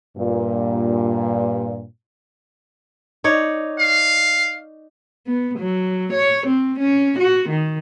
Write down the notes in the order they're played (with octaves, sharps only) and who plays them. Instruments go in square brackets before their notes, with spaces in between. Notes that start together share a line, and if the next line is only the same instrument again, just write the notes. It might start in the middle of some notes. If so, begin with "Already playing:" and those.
[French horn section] G2 A#2
[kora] D#4 C#5 D5
[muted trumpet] F5
[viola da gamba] B3
F#3
C#5
C4
C#4
F#4
D#3